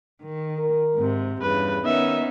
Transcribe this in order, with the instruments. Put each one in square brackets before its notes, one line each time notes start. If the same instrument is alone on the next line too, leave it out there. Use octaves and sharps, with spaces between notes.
[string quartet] D#3
[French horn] A#4
[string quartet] G#2 C3
[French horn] E2 [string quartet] G2 C#3 [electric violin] B4
[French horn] D#3 [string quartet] B3 C#4 D#4 [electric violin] E5